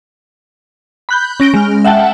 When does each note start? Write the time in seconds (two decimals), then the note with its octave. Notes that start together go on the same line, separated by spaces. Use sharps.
1.09 B5 F#6 G6
1.40 C#4 A#6 D7 G7
1.54 G#3 F6
1.84 E5 F#5 G5 A5